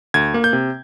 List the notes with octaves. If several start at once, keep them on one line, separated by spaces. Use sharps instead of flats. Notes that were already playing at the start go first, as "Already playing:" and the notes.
D2 G#6
A#3
G6
C3